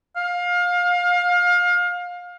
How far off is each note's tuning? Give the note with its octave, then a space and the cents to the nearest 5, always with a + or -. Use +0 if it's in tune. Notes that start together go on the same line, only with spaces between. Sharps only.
F5 +25